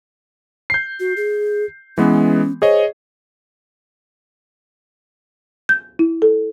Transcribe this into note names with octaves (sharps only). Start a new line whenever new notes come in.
G6 C7
F#4
G#4
E3 G#3 B3 C#4
G#4 C5 C#5 D#5
G6
E4
A4